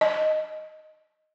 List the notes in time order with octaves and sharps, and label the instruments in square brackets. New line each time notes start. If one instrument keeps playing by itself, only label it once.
[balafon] D#5